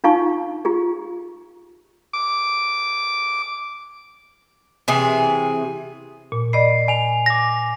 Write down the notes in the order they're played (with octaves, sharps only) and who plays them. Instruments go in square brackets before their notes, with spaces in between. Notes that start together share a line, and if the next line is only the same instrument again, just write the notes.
[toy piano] D4 D#4 F4 F5 A5 C#6
F4 G4 G#4
[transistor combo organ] D6
[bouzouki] C3 E3 G#4
[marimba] A#2
[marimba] D5 D#5 B5 [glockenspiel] C7
[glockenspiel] G#5 F7
D6 A#6